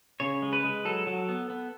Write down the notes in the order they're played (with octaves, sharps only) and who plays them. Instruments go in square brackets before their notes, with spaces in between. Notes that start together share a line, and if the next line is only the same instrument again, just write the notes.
[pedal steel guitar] C#3 C#5
G#3
B4
G#3
F#3 A4
F#3
B3
B3